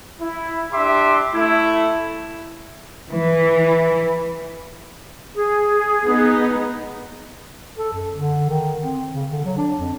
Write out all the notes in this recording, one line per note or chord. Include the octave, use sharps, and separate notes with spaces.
E4
D4 G4 E5 C6 D6
A3 E4
E3
G#4
B3 D#4
A4
F#2
D3
D#3
C4
C#3
D3
F#3
D4
F2